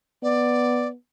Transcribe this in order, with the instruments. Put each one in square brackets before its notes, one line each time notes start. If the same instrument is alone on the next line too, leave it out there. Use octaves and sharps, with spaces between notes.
[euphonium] B3 [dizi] D5